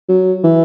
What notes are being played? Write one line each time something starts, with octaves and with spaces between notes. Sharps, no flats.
F#3
E3